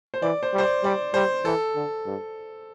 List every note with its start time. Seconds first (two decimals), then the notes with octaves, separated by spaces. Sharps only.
0.14 C5
0.22 E3 D5
0.43 C5
0.53 G3
0.58 C5
0.63 D5
0.84 G3 D5
1.14 G3 C5
1.45 E3 A4
1.75 D3
2.06 G2